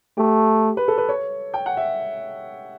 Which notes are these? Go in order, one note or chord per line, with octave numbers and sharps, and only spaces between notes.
A3 G4
B4
A4
B4
C#5
G5
F#5
E5